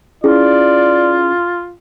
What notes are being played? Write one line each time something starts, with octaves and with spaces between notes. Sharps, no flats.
C#4 E4 F4 G#4 D5